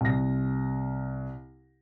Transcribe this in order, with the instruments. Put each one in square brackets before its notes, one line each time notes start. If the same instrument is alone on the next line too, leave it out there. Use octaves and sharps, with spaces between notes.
[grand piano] C2 A#6